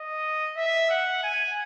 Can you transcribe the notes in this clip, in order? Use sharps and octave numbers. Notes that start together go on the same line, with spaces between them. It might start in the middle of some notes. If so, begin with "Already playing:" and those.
Already playing: D#5
E5
F#5
G#5